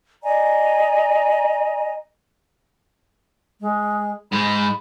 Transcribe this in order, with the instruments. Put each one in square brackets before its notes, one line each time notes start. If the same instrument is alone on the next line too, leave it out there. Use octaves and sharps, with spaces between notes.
[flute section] D5 D#5 G#5 A#5
[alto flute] G#3
[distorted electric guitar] G#2 G#3 [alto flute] B5